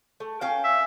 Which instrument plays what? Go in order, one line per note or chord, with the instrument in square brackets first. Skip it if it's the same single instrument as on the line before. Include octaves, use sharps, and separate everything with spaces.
[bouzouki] A3
C#4 F5 G5
[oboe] E5